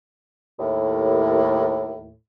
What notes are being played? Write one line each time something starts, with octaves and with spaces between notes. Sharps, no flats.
D#2 A2